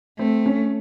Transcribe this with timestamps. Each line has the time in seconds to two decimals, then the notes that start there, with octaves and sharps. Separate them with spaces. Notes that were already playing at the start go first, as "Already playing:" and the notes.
0.18 A3 C4
0.46 C#4